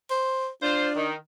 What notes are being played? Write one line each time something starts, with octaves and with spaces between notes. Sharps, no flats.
C5
D4 F4 C5
D#3